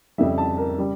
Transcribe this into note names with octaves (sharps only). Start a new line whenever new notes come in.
F2 C#3 G3 E5
A5
A#4
C#3 G3